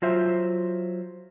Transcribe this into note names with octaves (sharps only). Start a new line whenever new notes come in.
F#3 F4 C5 E5